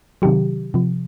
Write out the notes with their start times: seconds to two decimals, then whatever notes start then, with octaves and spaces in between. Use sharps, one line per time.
0.22 C3 D#3 F#3 G4
0.74 C3 F3